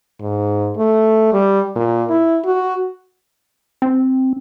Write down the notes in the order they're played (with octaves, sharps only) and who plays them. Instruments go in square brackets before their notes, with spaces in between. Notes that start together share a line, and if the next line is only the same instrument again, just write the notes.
[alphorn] G#2
A3
G3
A#2
E4
F#4
[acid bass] C4